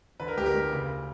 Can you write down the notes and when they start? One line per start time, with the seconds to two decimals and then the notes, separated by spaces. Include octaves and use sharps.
0.20 D3 B4
0.28 A#4
0.37 D2 G4
0.46 A#4
0.54 D2
0.72 C#3